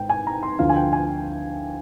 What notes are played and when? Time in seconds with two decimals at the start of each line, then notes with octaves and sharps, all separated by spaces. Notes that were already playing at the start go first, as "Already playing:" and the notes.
Already playing: G#1 G#2 G5
0.09 G#5
0.27 A#5
0.43 C6
0.59 D2 D3 F3 F5
0.69 G#5
0.76 G5
0.93 G#5